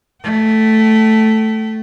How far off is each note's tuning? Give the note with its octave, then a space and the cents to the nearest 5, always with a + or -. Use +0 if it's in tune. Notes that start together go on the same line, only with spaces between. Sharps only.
A3 +0 G5 -40